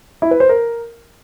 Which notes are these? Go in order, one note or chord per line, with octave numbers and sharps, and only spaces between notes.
E4
B4
C5
A#4